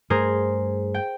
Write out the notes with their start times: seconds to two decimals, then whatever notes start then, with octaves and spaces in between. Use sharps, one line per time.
0.10 G2 A3 G#4 A#4 C5
0.94 G5